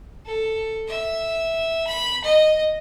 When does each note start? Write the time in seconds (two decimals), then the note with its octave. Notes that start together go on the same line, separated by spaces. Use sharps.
0.26 A4
0.88 E5
1.87 B5
2.24 D#5